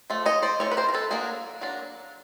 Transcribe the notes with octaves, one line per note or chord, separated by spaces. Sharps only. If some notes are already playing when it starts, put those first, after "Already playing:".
F3 A3
C#5 D#5
C5 D5
F3 A3 C#5
B4
A#4 C5
A#4
A4 B4
F#3 A#3 D4 G#4 A#4
F#3 A#3 D4